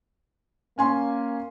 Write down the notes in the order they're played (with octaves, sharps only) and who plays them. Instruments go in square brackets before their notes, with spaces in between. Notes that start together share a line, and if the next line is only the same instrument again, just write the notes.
[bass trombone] A#3 [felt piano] C#4 G#5 C6